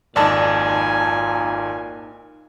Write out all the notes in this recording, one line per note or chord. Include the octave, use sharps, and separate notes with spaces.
G#1 F2 A#2 D#4 A4 D5 G#5 A5